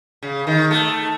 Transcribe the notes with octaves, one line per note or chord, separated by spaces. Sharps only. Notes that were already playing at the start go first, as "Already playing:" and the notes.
C#3
D#3
A3